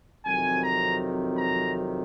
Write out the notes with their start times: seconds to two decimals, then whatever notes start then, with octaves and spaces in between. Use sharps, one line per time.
0.24 F2 C3 D#3 F#3 G#5
0.62 A#5
1.38 A#5